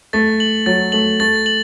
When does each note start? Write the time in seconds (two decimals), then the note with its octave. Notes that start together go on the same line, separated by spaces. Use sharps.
0.13 A3 A6
0.40 F#7
0.66 F#3 A6
0.92 A3 F#7
1.20 A3 A6
1.46 F#7